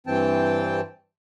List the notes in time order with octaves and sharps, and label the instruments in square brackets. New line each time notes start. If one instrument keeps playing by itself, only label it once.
[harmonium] G2 E3 C4 G5 A5